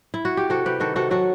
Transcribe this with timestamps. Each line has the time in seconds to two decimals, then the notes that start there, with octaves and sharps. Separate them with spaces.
0.14 E4
0.25 F#4
0.37 G4
0.49 C3 F#4 A4
0.65 C3 G4 B4
0.80 D#3 F#4 A4
0.96 C3 F#4 A4
1.11 F#3 F#4 A4